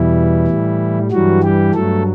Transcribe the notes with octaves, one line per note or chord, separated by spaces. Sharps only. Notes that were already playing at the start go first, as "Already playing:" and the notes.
Already playing: E2 B2 E3 G3 E4
A2 G3
G2 E3 F#3 G3 F#4
G3 G4
G2 F#3 A3 A4